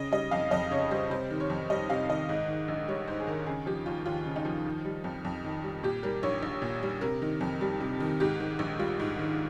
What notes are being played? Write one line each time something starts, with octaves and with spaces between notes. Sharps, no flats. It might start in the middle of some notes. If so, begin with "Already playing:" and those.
Already playing: C#3 D#5
G3 D#5
F2 F5
F2 D#5
C#3 C#5
G3 C5
C3 C5
D#3
C#5
F2
G3 D#5
C3 F5
D#3 D#5
G#2
D#3
A#1
G3 C#5
G#2 C5
G#4
D#3 A#4
C#3 G#4
F3 G4
D#2 F4
D#2 F4
C#3
D#4
F3
D#3
G3
F2
F2
D#3
G3
A#2 G4
G3 A#4
A#1 C#5
A#1
A#2
G3
C3 A#4
D#3
F2
G3
C3
D#3
G#2 G4
D#3
A#1
G3 F4
G#2
D#3